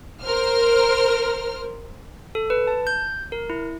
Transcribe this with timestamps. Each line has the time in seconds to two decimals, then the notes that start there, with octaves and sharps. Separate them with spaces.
0.23 A#4 C5 F6
2.35 A4
2.50 B4
2.67 A5
2.87 G6
3.32 A#4
3.50 E4